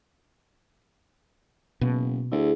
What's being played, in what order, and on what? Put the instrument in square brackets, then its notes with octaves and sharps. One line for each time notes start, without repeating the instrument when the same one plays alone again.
[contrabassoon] F#1 [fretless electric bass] B2
[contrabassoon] D2 [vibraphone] E4 G#4